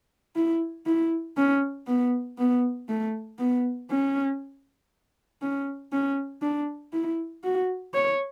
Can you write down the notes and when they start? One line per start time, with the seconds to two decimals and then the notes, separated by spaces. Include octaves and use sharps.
0.36 E4
0.86 E4
1.37 C#4
1.87 B3
2.38 B3
2.89 A3
3.39 B3
3.90 C#4
5.42 C#4
5.92 C#4
6.42 D4
6.93 E4
7.44 F#4
7.94 C#5